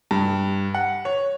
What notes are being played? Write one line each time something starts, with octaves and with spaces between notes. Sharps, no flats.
G2
F#5
C#5